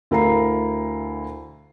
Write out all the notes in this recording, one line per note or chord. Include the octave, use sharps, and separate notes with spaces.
D2 E4 A#4 F5 A#5 C7